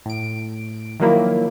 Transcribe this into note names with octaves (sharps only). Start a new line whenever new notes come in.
A2 D7
D#3 F3 F#3 A#3 E4